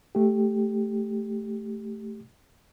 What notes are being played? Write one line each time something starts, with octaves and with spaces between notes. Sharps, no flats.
A3 G4